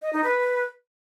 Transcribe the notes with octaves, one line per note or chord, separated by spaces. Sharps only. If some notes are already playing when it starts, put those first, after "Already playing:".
D#5
D#4
B4